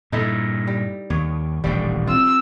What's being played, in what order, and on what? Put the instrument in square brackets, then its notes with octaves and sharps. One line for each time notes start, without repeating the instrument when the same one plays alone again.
[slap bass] G2 A#2 [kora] D#4 E4 A4
[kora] G3
[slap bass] D#2 [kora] C#5
[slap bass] D#1 A1 D3 [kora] G3 C4 G5
[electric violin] C4 E6 [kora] F4